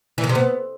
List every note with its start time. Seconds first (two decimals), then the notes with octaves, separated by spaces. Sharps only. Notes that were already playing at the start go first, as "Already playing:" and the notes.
0.18 E3
0.24 D#3
0.29 C3
0.35 B3